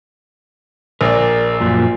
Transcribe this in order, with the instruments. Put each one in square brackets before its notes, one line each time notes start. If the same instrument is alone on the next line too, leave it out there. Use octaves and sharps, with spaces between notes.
[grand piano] A#1 D5 [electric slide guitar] A#4
[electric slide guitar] F#2 A#2 F3